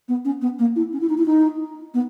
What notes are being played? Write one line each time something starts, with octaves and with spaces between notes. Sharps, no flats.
B3
C#4
B3
A#3
E4
C#4
E4
D#4
E4
D#4
B3